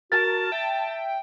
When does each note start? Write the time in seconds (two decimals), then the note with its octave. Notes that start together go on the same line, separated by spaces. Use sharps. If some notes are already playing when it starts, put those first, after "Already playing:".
0.12 F#4 A#4 A5 A6
0.52 E5 G5